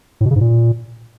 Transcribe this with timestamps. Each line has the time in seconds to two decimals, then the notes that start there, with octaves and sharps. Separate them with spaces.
0.21 A2
0.26 B2
0.31 C#3
0.36 G#2
0.41 A#2